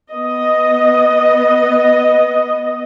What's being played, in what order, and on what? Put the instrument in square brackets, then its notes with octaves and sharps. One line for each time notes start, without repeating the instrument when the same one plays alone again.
[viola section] B3 D#5